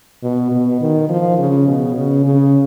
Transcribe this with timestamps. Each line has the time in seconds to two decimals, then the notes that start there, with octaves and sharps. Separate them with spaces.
0.23 B2
0.52 B2
0.81 D#3
1.09 F3
1.38 C#3
1.68 B2
1.96 C#3
2.24 C#3